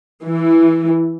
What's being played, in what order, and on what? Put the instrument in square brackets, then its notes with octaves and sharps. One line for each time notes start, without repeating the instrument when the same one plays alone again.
[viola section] E3